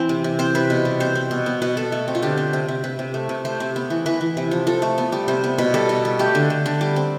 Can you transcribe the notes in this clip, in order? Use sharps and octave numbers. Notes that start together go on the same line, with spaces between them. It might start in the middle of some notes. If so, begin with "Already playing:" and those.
Already playing: E3 C4
C3
C3
C4 C5
C3 B4
B2
G3
C4 C5
C4
B2
B3
B2 B4
B2 A4
A3
C4
F4
D3 G4
C4
C3
C3
C3 B4
C3
A3
C3
A3 C5
C3
B3
E3
E3 B4
E3
C3
F3
F3 A4
A3
B3
G3
C3 C5
B3
B2 B4
G3 A4
B2
G3
A3 G4
D3
D3
D3
G3
C4